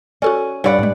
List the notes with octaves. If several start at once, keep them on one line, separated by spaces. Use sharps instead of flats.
C#4 F#4 A4 D5
G2 C#5 D5 F5 F#5 B5
A2 G#3